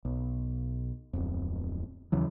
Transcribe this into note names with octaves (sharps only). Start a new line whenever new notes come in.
B1
D1 F2
D#2 C#3 E3 F#3